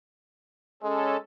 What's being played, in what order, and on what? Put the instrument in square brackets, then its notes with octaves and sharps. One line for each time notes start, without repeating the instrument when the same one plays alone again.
[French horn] G#3 [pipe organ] C#4 A4